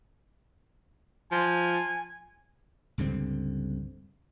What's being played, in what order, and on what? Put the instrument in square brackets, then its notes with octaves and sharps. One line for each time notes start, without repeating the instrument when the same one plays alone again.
[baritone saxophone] F3 [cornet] G#5
[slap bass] C#2 G2 D3 C4